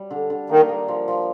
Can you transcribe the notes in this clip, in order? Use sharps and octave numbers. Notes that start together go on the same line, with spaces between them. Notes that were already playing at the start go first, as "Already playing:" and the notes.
Already playing: G3
D3
D3
D#3 A#3
A#3
F3
F3